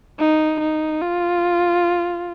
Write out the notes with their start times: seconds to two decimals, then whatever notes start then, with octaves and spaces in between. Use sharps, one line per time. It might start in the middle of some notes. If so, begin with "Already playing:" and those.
0.19 D#4
0.61 D#4
1.01 F4